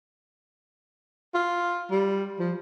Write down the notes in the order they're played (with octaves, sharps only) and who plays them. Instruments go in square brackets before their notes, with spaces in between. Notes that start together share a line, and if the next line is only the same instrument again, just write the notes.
[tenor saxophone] F4
G3
F3